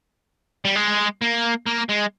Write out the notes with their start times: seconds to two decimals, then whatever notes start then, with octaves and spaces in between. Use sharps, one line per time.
0.65 G3
0.76 G#3
1.22 A#3
1.66 A#3
1.89 G#3